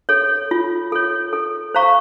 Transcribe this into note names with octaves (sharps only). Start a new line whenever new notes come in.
A4 C#5
F4
A4 C#5
A4
C5 F5 A#5 C#6